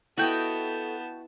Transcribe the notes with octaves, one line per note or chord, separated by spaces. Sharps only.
B3 E4 F#4 A4 D#5 F#5 G5 A5